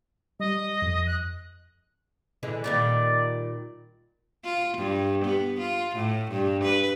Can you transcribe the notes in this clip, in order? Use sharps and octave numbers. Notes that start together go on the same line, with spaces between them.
G3 D#5
F2
F#6
D3 E3 G#3
A#2 D#3 G3 D5
F4
G2
B3
F4
A2
G2
B4